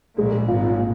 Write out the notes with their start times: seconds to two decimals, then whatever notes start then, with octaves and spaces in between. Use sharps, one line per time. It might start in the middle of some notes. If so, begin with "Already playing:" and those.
0.18 A#1 A#2 G#3
0.48 G#1 G#2 F4
0.79 A#2